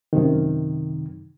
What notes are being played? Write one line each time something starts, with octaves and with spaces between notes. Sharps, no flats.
F#2 C3 D#3